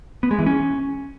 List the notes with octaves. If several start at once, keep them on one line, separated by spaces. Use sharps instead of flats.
B3
G#3
E3
C#4